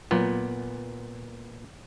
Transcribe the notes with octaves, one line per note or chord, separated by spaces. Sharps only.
A#2 F#3 B3 F4